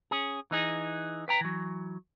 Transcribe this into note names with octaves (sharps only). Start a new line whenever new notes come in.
C#4 G#4
E3 D#4 G#4
B4 G5 A#5
E3 F#3